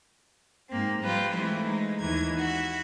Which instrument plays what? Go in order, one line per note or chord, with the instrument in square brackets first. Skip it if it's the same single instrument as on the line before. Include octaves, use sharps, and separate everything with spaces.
[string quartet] G#2 A#3 C4
F3 G3 F4 G4 B4
E3 G#3 A3 C4 E4
G#3 D#4
D#2 D#3 E3 G#6
F#4 E5